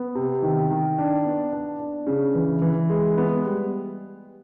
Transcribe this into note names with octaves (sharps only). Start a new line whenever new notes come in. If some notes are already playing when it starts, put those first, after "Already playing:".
Already playing: B3
C3
D#3
D#3
D4
B3
D4
D4
C#3
E3
E3
G#3
B3
G3